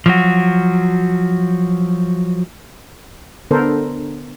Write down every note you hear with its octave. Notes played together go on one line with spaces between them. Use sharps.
F3 F#3 F#4
D3 B3 D4 A4 A#4 C5